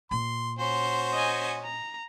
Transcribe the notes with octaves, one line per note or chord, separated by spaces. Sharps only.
A#2 C6
C#4 F#4 C5 C6
D#5 G#5
A#5